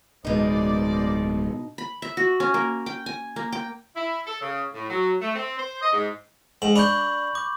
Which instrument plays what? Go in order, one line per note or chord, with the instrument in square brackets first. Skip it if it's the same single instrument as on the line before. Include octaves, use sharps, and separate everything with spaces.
[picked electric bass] D1 G#3 [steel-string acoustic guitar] B2 D#4 [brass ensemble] A#4 C5 D5
[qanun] B5
E5
F#4
C#4
A#3
G5
G#5
A#3
G5
[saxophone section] E4
A4
C#3
A2
F#3
A3
C4
C5
D#5
G#2
[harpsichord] G#2 [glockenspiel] F#7
[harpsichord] D4 [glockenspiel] B5 C#6 G6
[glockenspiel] D6